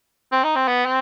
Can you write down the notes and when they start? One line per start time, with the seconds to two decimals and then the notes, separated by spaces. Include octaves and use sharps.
0.32 C4
0.44 D#4
0.55 C4
0.68 B3
0.86 C4